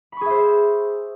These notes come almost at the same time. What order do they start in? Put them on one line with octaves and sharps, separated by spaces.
B5 C#6 G#4 E5 C5